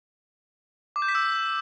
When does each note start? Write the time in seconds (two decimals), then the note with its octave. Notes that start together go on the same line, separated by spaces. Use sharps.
0.96 D6
1.02 G6
1.08 B6
1.15 E6